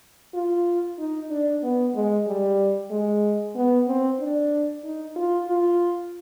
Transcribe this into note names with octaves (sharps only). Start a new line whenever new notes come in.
F4
D#4
D4
B3
G#3
G3
G#3
B3
C4
D4
D#4
F4
F4